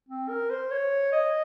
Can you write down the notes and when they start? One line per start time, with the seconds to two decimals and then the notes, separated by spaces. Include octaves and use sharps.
0.08 C4
0.29 A#4
0.50 C5
0.71 C#5
1.12 D#5